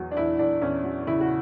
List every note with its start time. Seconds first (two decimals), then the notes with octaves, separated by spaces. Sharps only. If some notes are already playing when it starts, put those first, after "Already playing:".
Already playing: E2 F#3
0.11 D4
0.17 E2 E4
0.39 E2 D4
0.62 E2 C#4
0.84 F#3
1.07 C#3 E4
1.21 F#4